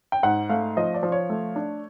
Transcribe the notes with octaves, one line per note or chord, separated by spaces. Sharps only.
G5
G#2 F#5
A3 F5
F3 D#5
D5
F3
C#5
A3
D4